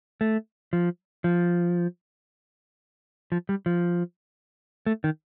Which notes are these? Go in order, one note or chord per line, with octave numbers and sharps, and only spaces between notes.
A3
F3
F3
F3
G3
F3
A3
D#3